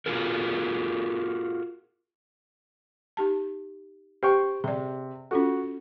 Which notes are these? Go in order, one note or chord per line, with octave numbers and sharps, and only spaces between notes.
F4 F#4 G#4 A#4
D#4 G4 A5
G4 C5 G5 C#6
C3 G#4 D5
C#4 F4 F#4 A4